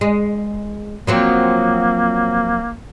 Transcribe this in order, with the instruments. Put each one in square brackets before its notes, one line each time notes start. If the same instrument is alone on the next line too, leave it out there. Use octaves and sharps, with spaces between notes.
[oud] G#3
[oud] F3 F#3 C4 [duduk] A#3